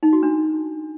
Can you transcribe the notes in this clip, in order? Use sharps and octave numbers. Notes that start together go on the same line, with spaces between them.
D#4
F#4
D4